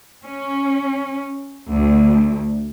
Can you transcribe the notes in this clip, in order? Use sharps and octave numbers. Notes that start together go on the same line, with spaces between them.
C#4
D2